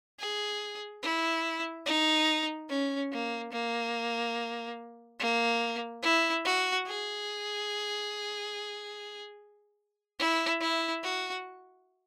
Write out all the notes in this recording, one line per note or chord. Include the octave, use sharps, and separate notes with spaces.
G#4
E4
D#4
C#4
A#3
A#3
A#3
E4
F#4
G#4
E4
E4
F#4